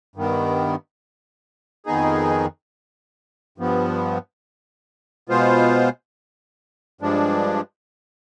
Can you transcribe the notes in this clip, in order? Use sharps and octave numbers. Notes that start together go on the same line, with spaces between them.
G2 D#3 B3
F2 D#3 B3 D#4 G#4
G2 F3 B3
B2 G#3 B3 F4 C5
G2 F3 G#3 D4